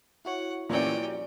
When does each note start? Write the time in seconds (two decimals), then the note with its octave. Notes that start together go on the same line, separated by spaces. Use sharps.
0.25 E4 F#4 C#5 F#5
0.69 A#2 E3 F3 G3 C#4 D5 G5